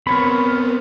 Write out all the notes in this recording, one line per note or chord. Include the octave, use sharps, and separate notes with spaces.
B3 C4 A#4 C#5 B5